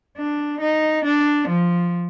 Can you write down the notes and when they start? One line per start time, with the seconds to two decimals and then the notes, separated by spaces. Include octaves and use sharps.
0.18 D4
0.61 D#4
1.05 D4
1.48 F3